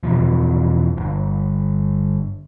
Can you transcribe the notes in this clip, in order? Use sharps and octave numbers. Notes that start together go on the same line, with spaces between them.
E2 B2 F3
G1